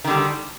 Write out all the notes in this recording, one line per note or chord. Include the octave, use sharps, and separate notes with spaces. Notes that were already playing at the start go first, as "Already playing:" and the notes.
D3 D#3 G3